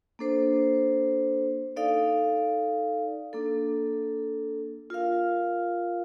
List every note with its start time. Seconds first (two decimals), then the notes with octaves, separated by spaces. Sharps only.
0.19 A#3 D4 A4 C5
1.76 D#4 A4 D5 F5
3.33 A#3 D4 A4
4.90 F4 A#4 F5